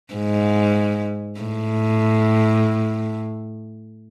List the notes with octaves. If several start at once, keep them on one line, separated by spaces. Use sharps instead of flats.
G#2
A2